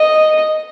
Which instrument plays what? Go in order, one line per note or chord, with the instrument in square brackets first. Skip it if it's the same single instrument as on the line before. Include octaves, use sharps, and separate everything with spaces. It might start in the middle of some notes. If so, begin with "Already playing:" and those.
Already playing: [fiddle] D#5